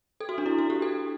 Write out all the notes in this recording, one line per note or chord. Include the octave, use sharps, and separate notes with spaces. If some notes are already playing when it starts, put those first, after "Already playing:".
A4
F#4
D4
E4
F#4
G4
A4